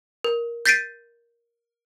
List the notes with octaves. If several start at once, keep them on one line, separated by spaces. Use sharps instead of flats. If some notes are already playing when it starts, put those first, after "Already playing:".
A#4
G6 A6 B6 C7 D7 D#7